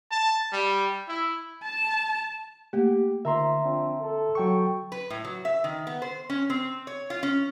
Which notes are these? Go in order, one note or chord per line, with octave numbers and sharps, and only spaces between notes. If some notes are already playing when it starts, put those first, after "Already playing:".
A5
G3
E4
A5
A3 A#3 G4 F#5
D3 D#3 F3 E5 A#5 C6
F3 C4 D4
A4
F#3 G5 C#6
B4
A2
F#3
E5
D#3
B3
C5
C#4
C4
C#5
F4
C#4